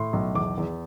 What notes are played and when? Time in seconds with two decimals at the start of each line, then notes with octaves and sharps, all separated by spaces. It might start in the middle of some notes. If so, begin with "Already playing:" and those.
Already playing: A2 C6
0.13 B1
0.35 E2 D6
0.57 E2